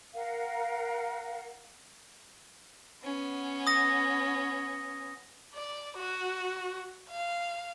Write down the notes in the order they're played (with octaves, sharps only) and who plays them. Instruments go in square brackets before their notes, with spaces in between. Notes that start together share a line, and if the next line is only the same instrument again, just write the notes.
[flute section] A#4 F5 F#5
[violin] B3 C#4
[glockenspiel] D#6 A#6
[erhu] D5
F#4
F5